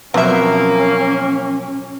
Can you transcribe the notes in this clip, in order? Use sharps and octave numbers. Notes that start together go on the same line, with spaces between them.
B2 F3 F#3 A#3 C4 C#4 E5